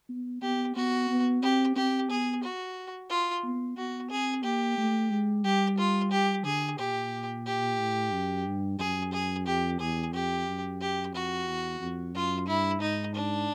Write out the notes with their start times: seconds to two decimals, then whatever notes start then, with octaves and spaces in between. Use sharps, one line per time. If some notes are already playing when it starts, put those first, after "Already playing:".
0.09 B3
0.42 B3 G4
0.75 B3 F#4
1.09 B3
1.42 C4 G4
1.76 C4 G4
2.10 B3 G#4
2.43 F#4
3.10 F4
3.44 B3
3.77 B3 F#4
4.10 C4 G#4
4.44 A#3 G4
4.78 A3
5.11 G#3
5.44 G3 G4
5.78 F4
6.11 G4
6.45 D3 G#4
6.79 A#2 G4
7.46 G4
7.79 A2
8.13 F#2
8.46 G2
8.79 F#2 G#4
9.13 G#4
9.46 F2 G4
9.80 E2 G#4
10.13 F2 G4
10.47 F#2
10.81 G4
11.14 F2 F#4
11.47 E2
11.80 F2
12.14 F#2 F4
12.48 G2 E4
12.81 G#2 D#4
13.15 D4